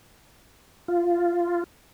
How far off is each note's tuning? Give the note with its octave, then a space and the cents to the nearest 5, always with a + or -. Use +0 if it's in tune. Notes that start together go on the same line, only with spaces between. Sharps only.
F4 -10